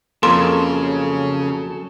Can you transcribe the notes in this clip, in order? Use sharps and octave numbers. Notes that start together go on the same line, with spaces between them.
F2 C#3 F#3 A#3 A4 C6